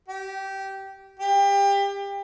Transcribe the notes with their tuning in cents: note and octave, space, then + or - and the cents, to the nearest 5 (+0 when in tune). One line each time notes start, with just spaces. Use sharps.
G4 -15
G4 +30